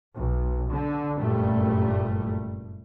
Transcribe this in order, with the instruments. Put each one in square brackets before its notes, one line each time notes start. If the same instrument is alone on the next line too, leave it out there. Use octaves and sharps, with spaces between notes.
[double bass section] B1
D3
F#1 G2 A#2 G3 A3